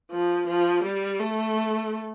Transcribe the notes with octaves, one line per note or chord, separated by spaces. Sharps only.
F3
F3
G3
A3